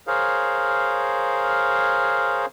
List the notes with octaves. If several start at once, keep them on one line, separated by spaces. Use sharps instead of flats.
G#4 A#4 C5 C#5 F5